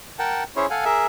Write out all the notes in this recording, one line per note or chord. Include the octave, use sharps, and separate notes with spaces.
A#4 F#5 G5 A5
C#4 E4 G#4 C5 C#5
A4 F5 F#5 G#5
G#4 A#4 E5